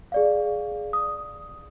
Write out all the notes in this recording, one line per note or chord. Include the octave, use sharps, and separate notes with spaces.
G#4 D5 F5
D#6